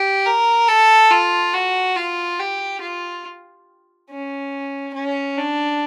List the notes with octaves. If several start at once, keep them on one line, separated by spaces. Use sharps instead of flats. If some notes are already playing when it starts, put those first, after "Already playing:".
Already playing: G4
A#4
A4
F4
F#4
F4
G4
F4
C#4
C#4
D4